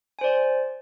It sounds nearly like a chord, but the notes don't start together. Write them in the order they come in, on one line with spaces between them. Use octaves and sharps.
G#5 C5 D5